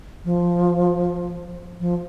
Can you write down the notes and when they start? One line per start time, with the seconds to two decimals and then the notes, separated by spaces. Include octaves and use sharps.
0.25 F3
1.80 F3